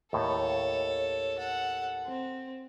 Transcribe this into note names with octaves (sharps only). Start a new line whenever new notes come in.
D#2 A2 A4 C#5
A4 F#5
C4